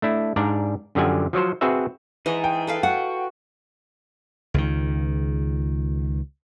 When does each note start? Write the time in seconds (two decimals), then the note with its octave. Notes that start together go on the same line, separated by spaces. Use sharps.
0.02 A3 D4 E4
0.36 G#2 D4 D5 F5 A#5
0.95 F#2 D3 F3 G4 F#5 G#5
1.33 F3 F#3 F#4 C5
1.61 C4 F#4 G#4 B4 E5
2.26 E3 D#4 G#4 B4 D#5
2.44 G5
2.67 A4 B4 F5
2.83 F#4 F#5
4.54 C#2 D#3